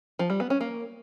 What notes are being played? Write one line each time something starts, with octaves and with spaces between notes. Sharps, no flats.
F3
G3
B3
C#4
A#3